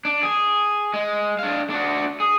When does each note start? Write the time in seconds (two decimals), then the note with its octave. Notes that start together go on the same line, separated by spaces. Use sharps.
0.05 D4
0.23 G#4
0.94 G#3
1.39 D4 F5
1.70 D4 F#4
2.20 G#4